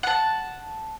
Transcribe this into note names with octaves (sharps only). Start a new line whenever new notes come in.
F#5 A5